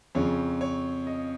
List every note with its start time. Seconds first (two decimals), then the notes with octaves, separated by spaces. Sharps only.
0.15 F2 C#3 F3 C#5
0.61 C#5
1.07 D#5